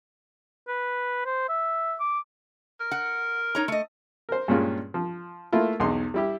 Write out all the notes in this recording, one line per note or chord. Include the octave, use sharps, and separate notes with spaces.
B4
C5
E5
D6
A#4
F#5
D#4 C#5 A#5
A3 D#5
A#4 C5
G2 A#2 G#3 C#4 F4
F3
A3 A#3 E4 F4
B1 E2 D#4 C6
G3 E4 G4